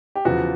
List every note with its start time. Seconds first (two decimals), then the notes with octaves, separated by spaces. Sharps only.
0.15 G4
0.25 E2 C#3 F3 F#4